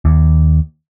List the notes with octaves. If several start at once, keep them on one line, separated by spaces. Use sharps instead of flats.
D#2